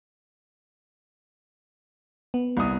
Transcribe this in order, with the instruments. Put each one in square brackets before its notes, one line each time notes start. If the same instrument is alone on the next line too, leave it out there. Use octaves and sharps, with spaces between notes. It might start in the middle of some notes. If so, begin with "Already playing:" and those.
[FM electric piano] B3
[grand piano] C2 D#6